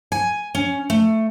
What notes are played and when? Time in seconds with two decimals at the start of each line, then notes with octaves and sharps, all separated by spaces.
0.12 G#5
0.55 C#4
0.90 A3